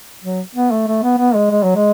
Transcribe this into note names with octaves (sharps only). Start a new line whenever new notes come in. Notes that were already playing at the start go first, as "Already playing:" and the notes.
F#3
B3
A3
A3
B3
B3
G#3
G#3
F#3
G#3